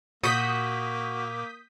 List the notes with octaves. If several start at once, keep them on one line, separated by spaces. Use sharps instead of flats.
A#2 A#3 F#4 D#6 G6 B6